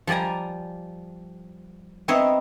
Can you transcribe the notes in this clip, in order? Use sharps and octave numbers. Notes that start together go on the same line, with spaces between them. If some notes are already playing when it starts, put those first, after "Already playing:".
F3 G3 D5 G#5 A#5
B3 C4 D#4 C#5 D#5 E5